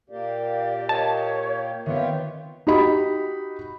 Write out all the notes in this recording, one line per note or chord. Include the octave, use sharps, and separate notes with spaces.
A#2 A#3 G4 D5
C#5 D#5 A5
D#3 B3 C4 F4 G4 C#5 E5
D#4 F#4 G4 D#5 B5